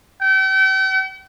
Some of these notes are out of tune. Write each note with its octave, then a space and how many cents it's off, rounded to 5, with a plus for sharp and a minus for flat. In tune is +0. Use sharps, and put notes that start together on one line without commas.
G5 -40